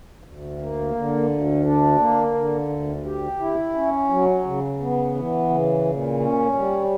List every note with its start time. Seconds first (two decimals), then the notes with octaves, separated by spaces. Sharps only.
0.24 D2
0.59 A#3
0.95 D3
1.29 D2
1.65 D4
1.99 A#3
2.34 D3
2.69 D2
3.05 G4
3.40 E4
3.75 C#4
4.10 F#3
4.45 C#3
4.80 B3
5.15 E3
5.49 C#3
5.85 A#2
6.20 C#4
6.55 G3